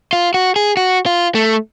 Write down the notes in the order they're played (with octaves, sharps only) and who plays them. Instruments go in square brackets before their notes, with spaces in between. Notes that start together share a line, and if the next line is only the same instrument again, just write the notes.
[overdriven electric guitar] F4
F#4
G#4
F#4
F4
A3